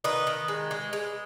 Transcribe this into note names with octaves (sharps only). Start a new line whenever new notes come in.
D#3 B4 D#5
D#3
G#3
G#3
G#3